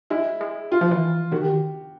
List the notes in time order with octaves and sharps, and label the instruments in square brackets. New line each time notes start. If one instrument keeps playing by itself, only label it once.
[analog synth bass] G#3 [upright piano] E4
[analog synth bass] G#3
[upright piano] F4
[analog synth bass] F3
E3
[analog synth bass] D#3 [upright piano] F#4
[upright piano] G4